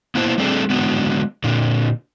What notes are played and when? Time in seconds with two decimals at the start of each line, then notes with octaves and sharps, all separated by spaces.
0.15 A#3 B3 E4 C5 A5
0.38 G3 A3 C4 D4 G#4 A4
0.70 D3 F#3 G#3 B3
1.44 A#2 D3